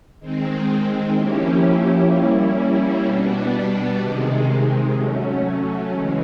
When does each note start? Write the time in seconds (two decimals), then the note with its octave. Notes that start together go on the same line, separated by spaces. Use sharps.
0.20 D#3 G#3 C4
1.15 F3 A#3 C#4 E4 G4
2.11 G3 A#3 C#4 E4
3.05 B2 G3 B3 D4
4.01 C3 D#3 G#3
4.95 F#3 A3 C#4
5.90 C#3 E3 G#3